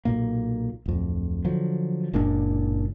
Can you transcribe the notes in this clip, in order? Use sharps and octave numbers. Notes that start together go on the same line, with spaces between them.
B1 A#2 A#3
D1 F2
D3 F3 F#3
F#1 A#2 G#3 D4